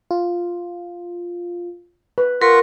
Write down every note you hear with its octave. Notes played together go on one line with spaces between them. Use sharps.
F4
B4
F4 A#4 F#5 C#6 B6